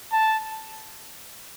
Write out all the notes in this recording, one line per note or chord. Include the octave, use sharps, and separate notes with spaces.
A5